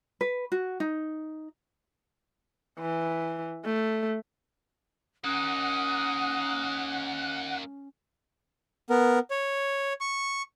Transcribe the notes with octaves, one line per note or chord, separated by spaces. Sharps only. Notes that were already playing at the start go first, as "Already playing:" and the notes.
B4
F#4
D#4
E3
A3
A#3 C#4 D#4 F#5 D#6
B3 A#4
C#5
C#6